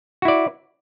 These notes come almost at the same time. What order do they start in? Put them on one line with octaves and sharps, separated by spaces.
F#4 E4 D5